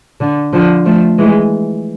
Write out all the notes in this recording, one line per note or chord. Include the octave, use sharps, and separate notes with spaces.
D3
D3 F3
F3 A3
E3 G#3